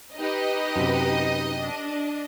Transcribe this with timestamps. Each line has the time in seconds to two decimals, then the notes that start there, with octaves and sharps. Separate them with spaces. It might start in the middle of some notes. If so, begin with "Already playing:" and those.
0.16 D#4 G4 B4 D#5
0.76 F#2 C3
1.60 D4